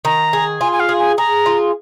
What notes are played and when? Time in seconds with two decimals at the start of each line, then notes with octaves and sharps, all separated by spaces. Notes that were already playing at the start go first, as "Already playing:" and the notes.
0.05 D#3 A#5
0.33 G#4
0.61 F4 G#5
0.72 G#5
0.80 F5
0.89 G#4
0.99 G#5
1.18 G#4 A#5
1.46 F4